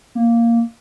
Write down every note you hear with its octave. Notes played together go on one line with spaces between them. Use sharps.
A#3